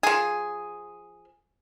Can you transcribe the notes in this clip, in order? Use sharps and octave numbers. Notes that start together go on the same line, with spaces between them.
F3 G#4